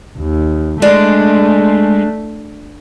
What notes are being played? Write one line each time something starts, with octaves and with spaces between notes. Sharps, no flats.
D#2
G#3 A3 D4